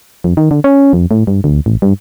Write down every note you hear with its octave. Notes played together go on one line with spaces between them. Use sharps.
F2
D#3
D3
C#4
F2
A2
G2
D2
A1
G2